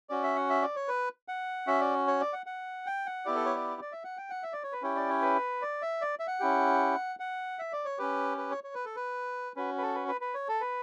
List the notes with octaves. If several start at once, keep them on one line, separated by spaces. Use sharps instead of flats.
C#4 F#4 D5
E5
F#5
E5
D5
C#5
B4
F#5
C#4 F#4 E5
D5
C#5
D5
F#5
F#5
G5
F#5
B3 E4 G4 D5
A4
C#5
D5
D5
E5
F#5
G5
F#5
E5
D5
C#5
B4
C#4 E4 G4 C#5
D5
C#5
B4
D5
E5
D5
E5
F#5
C#4 E4 G4
F#5
E5
D5
C#5
C#4 G4 B4
B4
C#5
C#5
B4
A4
B4
C#4 F#4 B4
B4
A4
B4
B4
B4
C#5
A4
B4